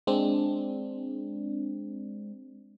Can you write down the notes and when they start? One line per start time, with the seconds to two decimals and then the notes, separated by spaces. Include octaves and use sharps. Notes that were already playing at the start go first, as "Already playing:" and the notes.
0.07 G#3 C4 D4